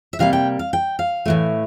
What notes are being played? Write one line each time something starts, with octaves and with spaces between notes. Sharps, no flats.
E5
C3 G3 A#3 F5
G5
F5
G5
F5
A2 E3 A3